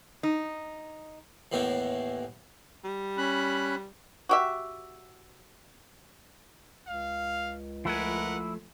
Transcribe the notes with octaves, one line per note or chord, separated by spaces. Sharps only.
D#4
D#2 A2 E3 B3
G3
C#4 B5 F#6
F#4 G4 E5
C#2 F5
F3 A3 E4 A#4 B4 F#5 G#5